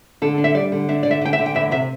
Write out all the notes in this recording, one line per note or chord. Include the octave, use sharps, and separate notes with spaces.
D3 A4
D4
E5
G3 D5
D3
D4 E5
D3 D5
E5
D3 G5
E5
D3
G5
E2 E5
C3 E5